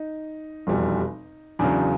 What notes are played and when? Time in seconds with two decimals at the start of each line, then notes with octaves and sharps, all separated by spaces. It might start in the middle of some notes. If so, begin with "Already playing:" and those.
Already playing: D#4
0.67 F1 E2 B2 G3
1.59 E2 C#3 F#3 D4